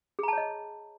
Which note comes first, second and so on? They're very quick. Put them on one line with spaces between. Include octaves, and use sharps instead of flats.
G#4 A#5 A5 C#5 D#5